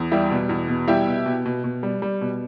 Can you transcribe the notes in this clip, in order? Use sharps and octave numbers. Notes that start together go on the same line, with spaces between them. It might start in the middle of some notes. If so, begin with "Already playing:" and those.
Already playing: E2
G3 E4 G4
B2
E2
B2
G3 E4 G4
B2
B2
B2
B2
G3
G3
B2